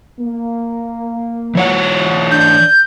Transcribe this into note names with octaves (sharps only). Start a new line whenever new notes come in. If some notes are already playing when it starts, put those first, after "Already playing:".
A#3
E3 C#5 F#5
D4 G6